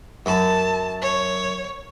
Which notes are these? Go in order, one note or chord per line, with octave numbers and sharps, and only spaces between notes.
F#2 A5 B5
C#5